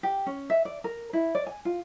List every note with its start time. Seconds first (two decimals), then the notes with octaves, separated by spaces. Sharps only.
0.03 G4
0.26 C#4
0.50 E5
0.65 D5
0.84 A#4
1.13 E4
1.35 D5
1.47 G#5
1.65 F4